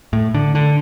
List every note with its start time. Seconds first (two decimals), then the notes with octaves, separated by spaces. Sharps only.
0.13 A2
0.34 D3
0.55 D3